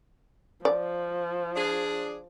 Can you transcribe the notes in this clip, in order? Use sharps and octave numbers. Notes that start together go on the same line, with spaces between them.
F3 D5
D4 G#4